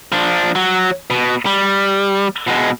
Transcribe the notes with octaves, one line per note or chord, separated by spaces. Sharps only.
F3 D4
F#3
B2
G3
B2 G#3